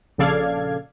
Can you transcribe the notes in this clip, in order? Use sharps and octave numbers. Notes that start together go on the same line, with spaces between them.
A#1 C#3 A4 D5 F5 G#6